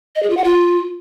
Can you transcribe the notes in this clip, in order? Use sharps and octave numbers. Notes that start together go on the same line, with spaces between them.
D#5
G#4
F4
F#5
F4